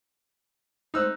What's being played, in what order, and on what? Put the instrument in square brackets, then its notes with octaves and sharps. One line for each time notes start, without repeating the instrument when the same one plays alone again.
[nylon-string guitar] G#3 A3 C5 [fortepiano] D#4 E6 F#6